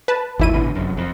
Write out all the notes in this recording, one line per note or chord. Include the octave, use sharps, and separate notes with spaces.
B4 A5
G#1 D#2 G#2 E4 D#7
A1 B2 D3
F1 F#2
F2